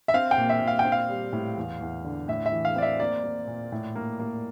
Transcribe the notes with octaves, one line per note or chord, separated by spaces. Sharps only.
E5
C4 F5
G5
A#2
E5
A#2
F5
G5
C4
F5
G3
A2
E2
E2
D3
A2 E5
E5
E3
F5
C4 D5
E5
A#3 D5
A#3
A#2
A2
A#3
A#3